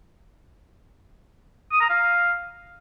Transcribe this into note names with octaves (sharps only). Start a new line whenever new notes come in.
D#6
A#5
F5